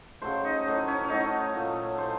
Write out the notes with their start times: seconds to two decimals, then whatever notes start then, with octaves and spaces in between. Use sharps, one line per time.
0.22 C#3 F#3 A3 C5
0.44 D#4
0.66 A2 F#3 A3
0.88 C#4
1.04 C#4
1.10 A2 F#3 A3 D#4
1.54 A#2 A3
1.98 A2 A3 C5